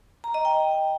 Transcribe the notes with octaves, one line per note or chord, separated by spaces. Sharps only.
A#5
D#5
G5